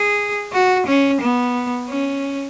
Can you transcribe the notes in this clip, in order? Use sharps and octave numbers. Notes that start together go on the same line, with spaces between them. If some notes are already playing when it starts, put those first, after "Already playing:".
Already playing: G#4
F#4
C#4
B3
C#4